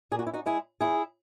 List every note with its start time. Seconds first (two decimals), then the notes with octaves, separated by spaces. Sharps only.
0.11 A#2 G#4
0.19 F#4
0.27 E4
0.34 D#4 F#4
0.46 G#3 E4 G#4
0.81 E2 E4 G#4